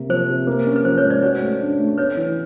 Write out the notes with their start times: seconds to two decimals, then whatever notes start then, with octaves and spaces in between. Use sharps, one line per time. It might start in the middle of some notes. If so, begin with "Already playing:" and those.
Already playing: C3 A#3
0.09 F3 C5
0.28 C3
0.47 A#3
0.66 C#4
0.76 B4
0.85 F3 C5
0.98 B4 C#5
1.04 G#2
1.10 C5 D5
1.22 F#4 B4 C#5
1.42 A3
1.60 D4
1.79 A3
1.98 B3 B4 C#5
2.17 E3